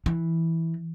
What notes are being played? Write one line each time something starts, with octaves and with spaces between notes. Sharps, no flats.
E3